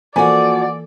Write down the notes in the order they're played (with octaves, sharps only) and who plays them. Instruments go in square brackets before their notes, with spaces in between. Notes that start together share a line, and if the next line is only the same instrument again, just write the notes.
[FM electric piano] E3 A#3 A4 [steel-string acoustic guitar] F3 F#4 [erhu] D5 [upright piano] G#5